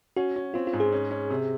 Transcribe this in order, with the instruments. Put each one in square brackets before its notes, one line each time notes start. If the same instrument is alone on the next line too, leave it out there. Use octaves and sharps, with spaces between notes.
[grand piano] C#4 [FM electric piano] F#4
[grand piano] C#4
[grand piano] C4 [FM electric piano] F4
[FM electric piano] F4
[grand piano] G#2
[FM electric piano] G#4
[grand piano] C#4
C#4
C3